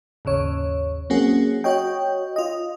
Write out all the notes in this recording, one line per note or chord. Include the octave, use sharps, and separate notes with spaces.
G#1 D#2 C#3 C#5
F#3 A#3 C4 C#4 F#4 G#4
F#4 C#5 D#5 G5
F4 D#5